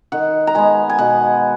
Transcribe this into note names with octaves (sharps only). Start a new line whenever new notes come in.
D#3 F#5
A#5
G#3 B3 G#5
G#5
B2 F#5